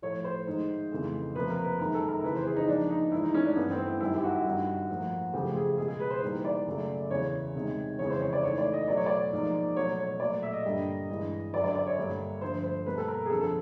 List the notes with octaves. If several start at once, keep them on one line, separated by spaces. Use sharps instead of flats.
A2 F3 A3 C#5
C5
G#2 D#3 G#3
F2 C#3 E3 A3
C3 F3 A#3 B4
A#4
B4
F#2 D#3 G#3 A#4
A4
A#4
F2 C#3 E3 B4
C5
G#4
D#4
G#2 F3 A#3 D4
D#4
G#2 E3 G#3 E4
D#4
C#4
D4
G2 E3 A3 B3
C4
E4
F#2 D#3 G3 E4
G4
F#4
G2 D#3 G3
A2 F3 A#3
F#2 C#3 F3 A3 G4
G#4
B2 G#3 G#4
G#4
B4
C5
G#2 E3 G3 A#3
D5
F#2 C#3 F#3 A3
E2 C#3 E3 C#5
C3 D#3 G#3
F2 C#3 E3 G#3 C#5
C5
C#5
D5
G#2 E3 A3 C#5
D5
D#5
B2 F#3 A3 D5
C#5
D5
G#2 F3 A#3
B2 F#3 A3 C#5
C#5
A#2 F#3 A3 D5
E5
D#5
G2 D3 G3 A#3
G2 E3 G#3
F#2 D3 F#3 D5
D5
D5
C#5
G2 D3 G3 A#3
G2 D3 F3 A3 C5
C5
B2 G3 A#3 B4
A4
A#4
G#4
F2 D3 F3 A4
A4